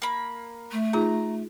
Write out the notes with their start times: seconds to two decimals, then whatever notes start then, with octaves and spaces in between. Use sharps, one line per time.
0.02 A#3 B5
0.72 A3
0.93 D#4 F4 G#4 A#5